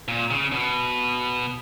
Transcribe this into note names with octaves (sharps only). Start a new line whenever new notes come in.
A#2
C#3
B2